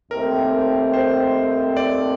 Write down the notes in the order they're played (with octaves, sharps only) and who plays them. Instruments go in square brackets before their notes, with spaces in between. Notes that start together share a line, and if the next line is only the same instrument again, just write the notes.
[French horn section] D#2 D#3 A3 C4 [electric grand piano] A#4
[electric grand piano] C5
D5